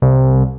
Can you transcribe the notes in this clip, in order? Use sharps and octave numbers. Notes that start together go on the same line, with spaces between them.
C2